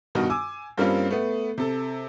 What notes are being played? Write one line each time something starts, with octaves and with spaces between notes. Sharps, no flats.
G2 B2 D#3 D#4 F#4
G#5 D6 E6
G2 G3 A#3 C4 C#4 F4
A3 B3
C3 A4